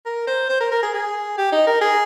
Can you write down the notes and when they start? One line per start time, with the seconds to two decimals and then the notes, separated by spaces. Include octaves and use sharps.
0.06 A#4
0.27 C5
0.49 C5
0.60 A#4
0.71 A#4
0.82 G#4
0.94 G#4
1.38 G4
1.52 D#4
1.67 A#4
1.81 G#4